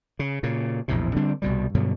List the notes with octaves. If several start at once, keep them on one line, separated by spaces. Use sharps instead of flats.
C#3
A#2 C#3
A#1 E2 A2 C3
D3 G3 C4 D4
C2 B2 G3
G2 B2 D3 F#3